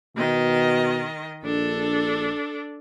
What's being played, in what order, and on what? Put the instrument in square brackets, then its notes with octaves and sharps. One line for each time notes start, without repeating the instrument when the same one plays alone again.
[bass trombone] B2 [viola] D#3 D#5
[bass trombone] A#1 [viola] D4 A4